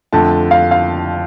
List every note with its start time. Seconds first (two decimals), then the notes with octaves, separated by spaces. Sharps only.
0.13 F2 D3 F3 A3 A5
0.51 F5
0.71 F5